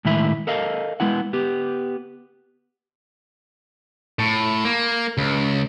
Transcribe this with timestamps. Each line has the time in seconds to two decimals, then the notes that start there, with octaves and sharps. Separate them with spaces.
0.05 A2 D#3 G#3 E4 E5 B5
0.47 A4 A#4 D#5 F5
1.00 G#3 B3 E4 F#5
1.33 B3 G4
4.19 A2
4.64 A#3
5.18 C#2